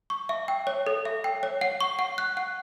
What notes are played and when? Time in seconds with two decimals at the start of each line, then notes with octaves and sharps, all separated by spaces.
0.10 C#6
0.29 E5
0.48 G5
0.67 C#5
0.87 A4
1.05 E5
1.24 G5
1.43 C#5
1.61 F#5
1.81 C#6
1.99 F#5
2.18 F#6
2.37 F#5